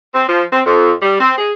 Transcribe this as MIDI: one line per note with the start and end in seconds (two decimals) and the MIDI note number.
0.14 0.28 60
0.29 0.45 53
0.53 0.62 60
0.66 0.93 41
1.02 1.19 55
1.21 1.33 60
1.38 1.53 68